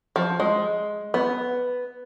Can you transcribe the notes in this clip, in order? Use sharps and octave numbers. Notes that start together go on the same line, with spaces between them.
F3
G#3
B3